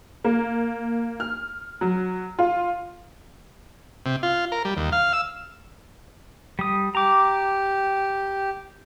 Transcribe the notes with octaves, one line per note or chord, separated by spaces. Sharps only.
A#3
F6
F#3
F4
C3
F4
A#4
G3
D#2
F5
E6
G3 D#6
G4 A#5 D6